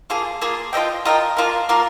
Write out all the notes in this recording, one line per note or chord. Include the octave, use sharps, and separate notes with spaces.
A#3 F4 G#4
A#3 F4 G#4
F4 A#4 D#5 G5
F4 A#4 D#5 G5
A#3 F4 A#4
A#3 F4 A#4